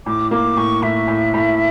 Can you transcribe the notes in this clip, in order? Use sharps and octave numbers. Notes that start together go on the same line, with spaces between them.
A2 D6
A#3 D6
A2 C#6
A2 E5
A2
A2